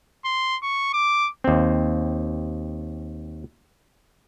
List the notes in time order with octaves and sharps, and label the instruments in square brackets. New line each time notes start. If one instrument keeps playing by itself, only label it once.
[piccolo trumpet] C6
C#6
D6
[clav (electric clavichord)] D#2 C4